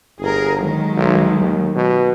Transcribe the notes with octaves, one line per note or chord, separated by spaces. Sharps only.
G1 G#4 A#4
D#3 F#3 G#3
B1
D#2
B2